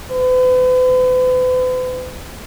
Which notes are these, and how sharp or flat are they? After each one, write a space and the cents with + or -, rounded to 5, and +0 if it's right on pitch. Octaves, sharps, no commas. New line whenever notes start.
B4 +45